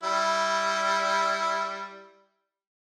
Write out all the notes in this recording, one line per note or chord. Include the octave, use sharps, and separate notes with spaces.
G3 E4